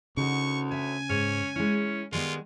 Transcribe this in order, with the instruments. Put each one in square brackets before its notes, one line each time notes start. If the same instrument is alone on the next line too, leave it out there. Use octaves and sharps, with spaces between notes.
[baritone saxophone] D2 [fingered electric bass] C#3 [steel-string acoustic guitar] D#4 F#4 [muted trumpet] C#6
[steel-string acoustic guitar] C#5 E5 [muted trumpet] G#5
[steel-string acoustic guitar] G#2 [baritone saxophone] C#4
[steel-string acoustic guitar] G#3 E4 [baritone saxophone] C#4
[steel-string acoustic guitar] D#3 G3 B3 [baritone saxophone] G#3 [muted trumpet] F4